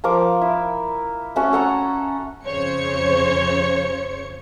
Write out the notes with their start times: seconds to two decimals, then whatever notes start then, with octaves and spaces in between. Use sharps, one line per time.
0.04 F3 A#4 D6
0.41 E4
1.36 A3 C#4 F#4
1.53 A4 F#5 A#5
2.44 F2 C#3 C5 C#5 C#7